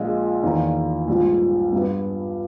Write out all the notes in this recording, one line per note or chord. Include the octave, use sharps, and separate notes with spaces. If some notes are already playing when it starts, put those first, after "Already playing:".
Already playing: A#1 A#2 G#3
E2 D#3 A#3
A#1 G#2 G3
G2 G3 B3